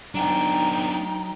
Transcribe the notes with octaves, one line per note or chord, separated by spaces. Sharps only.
F#3 B3 D4 D#4 G5 A#5